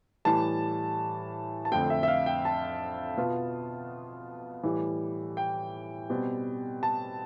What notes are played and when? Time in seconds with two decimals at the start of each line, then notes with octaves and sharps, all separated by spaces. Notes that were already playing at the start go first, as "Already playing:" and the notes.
0.25 A2 E3 G3 A5
1.65 A5
1.72 F2 D3 A3 C4 G5
1.90 E5
2.03 E5
2.08 F5
2.26 G5
2.45 A5
3.17 B2 B3 F4
4.63 A2 E3 G3
5.37 G5
6.09 B2 G3 C4
6.83 A5